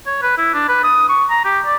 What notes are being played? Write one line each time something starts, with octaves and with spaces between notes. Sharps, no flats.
C#5
B4
E4
D4
B4
D#6
C#6
A#5
G4
D5